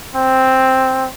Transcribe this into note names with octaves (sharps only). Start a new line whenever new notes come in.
C4